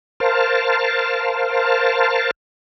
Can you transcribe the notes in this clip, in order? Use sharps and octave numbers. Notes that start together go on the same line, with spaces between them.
A#4 C5 F5 A5